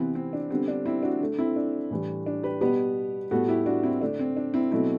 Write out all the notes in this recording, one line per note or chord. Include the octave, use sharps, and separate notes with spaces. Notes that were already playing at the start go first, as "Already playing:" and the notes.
Already playing: C3 E3 B3 C4 E4
C4
D4
D3 G3 B3 C4
D4
C4 E4
D4 F#4
D3 A3
C4 E4
D4
A2 E3 G3
D4
G4 B4
B2 G3 B3 G4 B4
A2 G3 B3 F#4 A4
E4 G4
D4 F#4
C4 E4
D3 A3 D4
C4
D4
C4 E4
B2 F#3 A3 C4 E4